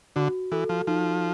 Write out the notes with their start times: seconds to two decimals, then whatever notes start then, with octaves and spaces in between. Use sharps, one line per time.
0.16 D3 F#4
0.52 E3 A4
0.69 F3
0.87 F3 D#4